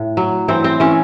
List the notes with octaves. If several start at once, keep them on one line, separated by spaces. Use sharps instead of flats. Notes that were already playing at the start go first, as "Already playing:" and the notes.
Already playing: A2
F#3
E3 C4
C4
E3 C#4